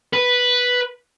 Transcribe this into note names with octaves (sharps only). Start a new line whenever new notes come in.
B4